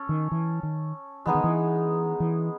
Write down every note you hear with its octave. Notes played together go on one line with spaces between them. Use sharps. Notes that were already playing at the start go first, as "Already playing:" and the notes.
Already playing: C#4 A4
D#3
E3
D#3
E3 G#3 B3 D#4 G#4
D#3
E3
E3